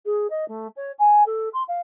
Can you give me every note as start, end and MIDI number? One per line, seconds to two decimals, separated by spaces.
0.05 0.27 68
0.30 0.47 75
0.48 0.67 57
0.76 0.91 73
0.98 1.23 80
1.26 1.48 69
1.53 1.62 84
1.68 1.81 77